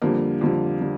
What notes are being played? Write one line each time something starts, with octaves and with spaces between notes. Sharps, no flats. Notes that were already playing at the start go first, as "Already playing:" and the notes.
F2 D3 G3 A#3
F2 D3 G3
D3 G3